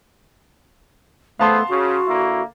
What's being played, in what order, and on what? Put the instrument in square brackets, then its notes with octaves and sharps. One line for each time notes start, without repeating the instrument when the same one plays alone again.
[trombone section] E2 B3 C5 [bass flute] A3 [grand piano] F5 A5 C6
[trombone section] C#3 [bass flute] F#4
[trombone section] D3 A#3 E4